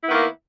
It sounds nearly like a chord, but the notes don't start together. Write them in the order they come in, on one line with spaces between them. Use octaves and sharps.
E4 B3 D#3 A#3